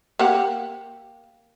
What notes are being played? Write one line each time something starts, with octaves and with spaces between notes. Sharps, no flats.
A#3 G4 F#5